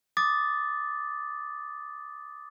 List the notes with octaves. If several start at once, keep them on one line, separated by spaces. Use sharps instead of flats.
D6 D#6 A6